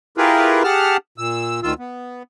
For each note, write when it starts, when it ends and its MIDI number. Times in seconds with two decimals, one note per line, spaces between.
0.17 0.63 64
0.17 0.63 65
0.17 0.63 67
0.17 0.63 68
0.17 0.63 70
0.17 0.63 71
0.64 0.97 67
0.64 0.97 68
0.64 0.97 78
0.64 0.97 81
0.64 0.97 89
1.18 1.60 46
1.18 1.60 88
1.63 1.74 38
1.63 1.74 51
1.63 1.74 65
1.63 1.74 88
1.79 2.23 59